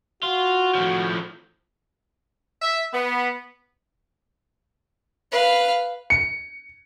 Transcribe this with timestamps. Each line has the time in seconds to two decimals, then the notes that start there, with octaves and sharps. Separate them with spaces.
0.23 F4 F#4
0.75 A2 F3
2.62 E5
2.94 B3
5.31 B4 F5
6.10 C#7